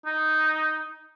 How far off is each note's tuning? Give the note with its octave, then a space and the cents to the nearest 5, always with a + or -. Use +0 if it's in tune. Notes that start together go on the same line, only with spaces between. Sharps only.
D#4 +0